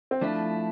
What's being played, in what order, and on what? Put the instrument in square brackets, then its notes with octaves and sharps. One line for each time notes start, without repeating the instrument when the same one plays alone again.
[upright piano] C4
[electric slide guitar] F3 A3 E4 [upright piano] D4